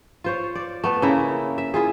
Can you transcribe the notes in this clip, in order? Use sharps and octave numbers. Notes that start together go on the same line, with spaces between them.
F4 C5 C#5
D5
A3 B3 A4
C#3 A#3 E4
E5
E4 F4 G#4